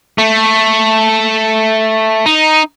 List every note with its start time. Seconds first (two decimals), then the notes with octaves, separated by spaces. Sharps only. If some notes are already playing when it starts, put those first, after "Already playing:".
0.18 A3
2.26 D#4